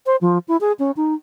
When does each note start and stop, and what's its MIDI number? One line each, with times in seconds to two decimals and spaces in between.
0.06 0.16 72
0.21 0.38 53
0.48 0.57 64
0.61 0.72 68
0.79 0.91 61
0.97 1.14 63